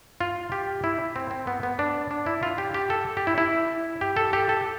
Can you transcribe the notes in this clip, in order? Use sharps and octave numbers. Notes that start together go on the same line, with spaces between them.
F4
G4
E4
C4
C4
B3
B3
D4
D4
E4
F4
G4
G4
A4
G4
E4
E4
G4
A4
G4
A4